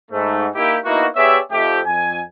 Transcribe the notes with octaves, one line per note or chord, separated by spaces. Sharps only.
G#2 A3
A#3 D#4 E4 G4
A#3 B3 D#4 E4 F#4
B3 G4 G#4 C#5 D5 E5
F2 A3 G4
F2 G#5